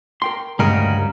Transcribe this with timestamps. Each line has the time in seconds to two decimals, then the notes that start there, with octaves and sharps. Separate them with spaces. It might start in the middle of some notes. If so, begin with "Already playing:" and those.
0.22 A#4 G5 C6
0.59 D2 G2 C#3 G3 G#3 A#4